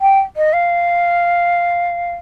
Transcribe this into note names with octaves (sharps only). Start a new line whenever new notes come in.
G5
D#5
F5